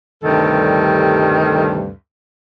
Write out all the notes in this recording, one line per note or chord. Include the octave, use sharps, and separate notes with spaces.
D2 G2 C3 D#3 G3 A4